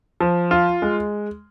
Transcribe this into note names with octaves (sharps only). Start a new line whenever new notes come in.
F3
F4
G#3